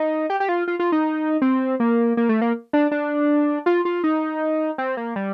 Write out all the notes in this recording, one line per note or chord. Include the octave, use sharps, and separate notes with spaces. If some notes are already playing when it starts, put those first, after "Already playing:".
Already playing: D#4
G4
G4
F4
F4
F4
D#4
C4
A#3
A#3
A3
A#3
D4
D4
F4
F4
D#4
C4
A#3
G3